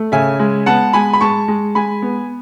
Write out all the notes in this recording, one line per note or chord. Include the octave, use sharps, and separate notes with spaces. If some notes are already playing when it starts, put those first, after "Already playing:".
Already playing: A3
C#3 E5 G#5
G#3
B3 F#5 A5
G#3 G#5 B5
B5
G#3 A5 C#6
G#3
G#3 G#5 B5
B3